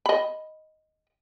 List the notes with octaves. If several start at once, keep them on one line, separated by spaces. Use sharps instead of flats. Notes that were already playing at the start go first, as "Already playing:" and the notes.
D#5 B5